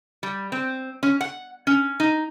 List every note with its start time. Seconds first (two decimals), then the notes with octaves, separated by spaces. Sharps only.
0.23 G3
0.52 C4
1.03 C#4
1.21 F#5
1.67 C#4
2.00 D#4